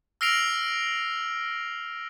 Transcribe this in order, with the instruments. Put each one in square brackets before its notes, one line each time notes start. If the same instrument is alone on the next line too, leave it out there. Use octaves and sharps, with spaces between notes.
[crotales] E6 F6 A#6 C7 D7 F7